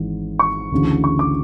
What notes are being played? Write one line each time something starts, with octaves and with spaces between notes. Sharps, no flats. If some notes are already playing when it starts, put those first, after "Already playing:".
Already playing: G#1 G#2 E3
C#6
D2 C#3 E3
C#6
D6